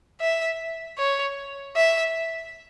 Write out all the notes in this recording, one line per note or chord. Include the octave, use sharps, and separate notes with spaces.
E5
C#5
E5